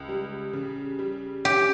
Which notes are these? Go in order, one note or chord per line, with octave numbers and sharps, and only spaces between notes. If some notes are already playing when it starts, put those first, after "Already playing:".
Already playing: C#2
G3
C#3
G3
C#4 G4